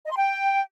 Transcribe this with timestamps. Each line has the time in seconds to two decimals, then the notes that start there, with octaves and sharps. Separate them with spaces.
0.05 D#5
0.11 C6
0.17 G5